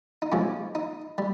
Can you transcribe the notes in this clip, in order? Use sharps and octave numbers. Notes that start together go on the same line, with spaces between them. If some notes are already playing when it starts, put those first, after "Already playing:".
D#4
C3 F3 G#3 C#4
D#4
G3